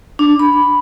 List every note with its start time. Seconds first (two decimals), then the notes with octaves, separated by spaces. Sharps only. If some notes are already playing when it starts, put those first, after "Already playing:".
0.19 D4
0.40 B5